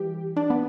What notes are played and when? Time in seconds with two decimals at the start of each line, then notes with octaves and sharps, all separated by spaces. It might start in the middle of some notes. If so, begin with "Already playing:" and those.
Already playing: E3 G3 G4
0.36 D4
0.50 B3